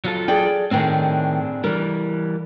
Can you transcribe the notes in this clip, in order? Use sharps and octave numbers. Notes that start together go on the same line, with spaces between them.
F#3 F4 A4
G#4 D5 G5
A2 D#3 C4 D4 G#4
E3 G3 A#4